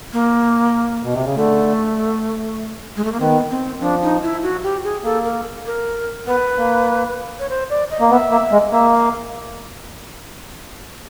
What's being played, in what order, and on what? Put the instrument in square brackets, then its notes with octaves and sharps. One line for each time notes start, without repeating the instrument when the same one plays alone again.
[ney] A#3
[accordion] B2
C3
C#3
[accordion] D3 [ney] A3
[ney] G#3
A3
A#3
[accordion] D#3 [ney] C4
[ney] B3
C4
[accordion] F3 [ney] D4
[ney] D#4
E4
F#4
G4
G#4
[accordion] A#3 [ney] A4
[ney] A#4
A#4
[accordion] B3 [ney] B4
[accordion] A#3
[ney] C#5
C5
D5
D#5
[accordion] A#3
[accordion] B3 [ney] E5
[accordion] A#3
G#3
[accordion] A#3 [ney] E5
[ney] F5